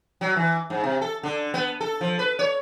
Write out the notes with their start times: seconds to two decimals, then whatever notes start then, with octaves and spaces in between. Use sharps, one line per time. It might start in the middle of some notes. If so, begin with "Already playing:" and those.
0.21 F#3
0.36 E3
0.70 G#2
0.84 C3
1.01 A4
1.23 D3
1.54 B3
1.81 A4
2.01 F3
2.19 B4
2.39 C#5